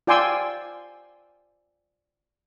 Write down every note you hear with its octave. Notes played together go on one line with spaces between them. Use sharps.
F4 D5 G5 G#5 C6 E6